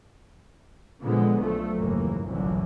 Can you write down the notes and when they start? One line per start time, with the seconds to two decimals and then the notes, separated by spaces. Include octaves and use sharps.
1.01 A#2 D3 F3 G#3 B3
1.36 B1 F3 A3
1.76 F#1 D#2 G#2 E3 A#3
2.23 G1 C2 F#2 A2 E3